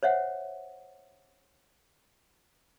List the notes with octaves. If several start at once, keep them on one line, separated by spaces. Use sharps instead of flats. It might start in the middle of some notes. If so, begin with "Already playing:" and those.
C5 C#5 E5 F#5